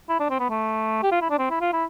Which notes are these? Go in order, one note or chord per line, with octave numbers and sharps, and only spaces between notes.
E4
D4
C4
B3
A3
G4
F4
E4
D4
C4
E4
F4
E4